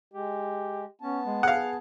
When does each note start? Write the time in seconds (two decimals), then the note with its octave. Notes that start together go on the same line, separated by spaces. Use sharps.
0.13 G#3 G4
1.01 B3 C#4 A5
1.25 G#3
1.43 G#4 F5 F#5